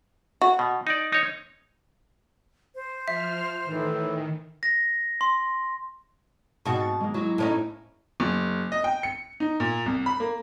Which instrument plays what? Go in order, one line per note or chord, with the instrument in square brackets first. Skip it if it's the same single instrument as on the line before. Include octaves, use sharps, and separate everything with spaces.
[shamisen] F#4
[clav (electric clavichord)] B2
D#4 D5
D#4 C#5
[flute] C5
[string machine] F3 F6 [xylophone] E5
[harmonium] A2 E3 [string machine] D#3
[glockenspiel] A#6
C6
[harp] G#2 C4 [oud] B2 F#4
[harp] A6
G#3 A#3
[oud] F#3 [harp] A#3 E4
[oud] A2 C#4 D#4
[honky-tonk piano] F#1
D#5
G5
C#7
D#4
A#2
C2
B5
A#3